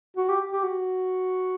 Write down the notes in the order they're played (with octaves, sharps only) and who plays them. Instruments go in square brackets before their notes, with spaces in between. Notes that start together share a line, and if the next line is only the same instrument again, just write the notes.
[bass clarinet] F#4
G4
G4
F#4